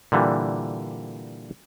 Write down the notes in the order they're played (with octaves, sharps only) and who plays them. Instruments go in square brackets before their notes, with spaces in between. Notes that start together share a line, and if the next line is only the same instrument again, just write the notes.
[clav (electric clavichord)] A#2 D3 E3 G3